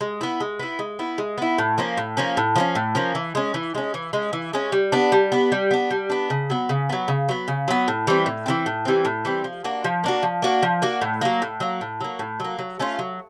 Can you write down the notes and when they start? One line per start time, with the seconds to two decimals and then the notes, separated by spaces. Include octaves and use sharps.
0.01 G#3
0.21 B3 E4
0.40 G#3
0.59 B3 E4
0.79 G#3
0.99 B3 E4
1.18 G#3
1.38 B3 E4
1.58 A2
1.78 F3 A#3 C#4
1.97 A2
2.17 F3 A#3 C#4
2.37 A2
2.56 F3 A#3 C#4
2.75 A2
2.95 F3 A#3 C#4
3.15 E3
3.35 G#3 C#4
3.54 E3
3.75 G#3 C#4
3.94 E3
4.13 G#3 C#4
4.33 E3
4.53 G#3 C#4
4.72 G3
4.92 B3 D4
5.12 G3
5.32 B3 D4
5.52 G3
5.71 B3 D4
5.90 G3
6.10 B3 D4
6.30 C#3
6.50 F#3 B3
6.69 C#3
6.89 F#3 B3
7.08 C#3
7.29 F#3 B3
7.48 C#3
7.68 F#3 B3
7.88 A2
8.07 E3 G3 C4
8.26 A2
8.46 E3 G3 C4
8.66 A2
8.85 E3 G3 C4
9.05 A2
9.25 E3 G3 C4
9.44 F3
9.64 A#3 D4 F#4
9.84 F3
10.04 A#3 D4 F#4
10.23 F3
10.42 A#3 D4 F#4
10.63 F3
10.82 A#3 D4 F#4
11.02 A2
11.21 F#3 A#3
11.42 A2
11.60 F#3 A#3
11.81 A2
12.01 F#3 A#3
12.19 A2
12.40 F#3 A#3
12.59 F#3
12.79 A3 C#4 F4
12.99 F#3